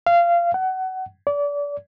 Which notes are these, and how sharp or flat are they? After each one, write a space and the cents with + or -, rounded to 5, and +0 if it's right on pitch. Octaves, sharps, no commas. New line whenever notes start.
F5 -20
F#5 +25
D5 -30